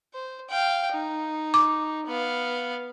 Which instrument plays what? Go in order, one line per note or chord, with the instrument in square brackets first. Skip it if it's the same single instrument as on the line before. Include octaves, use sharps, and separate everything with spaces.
[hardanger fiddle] C5
F5 G5
D#4
[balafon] D6
[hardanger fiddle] B3 F5